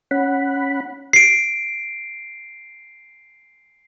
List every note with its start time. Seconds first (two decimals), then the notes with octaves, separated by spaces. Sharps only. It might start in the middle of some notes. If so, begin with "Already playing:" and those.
0.11 C#4 F#5 B5
1.13 C7 D7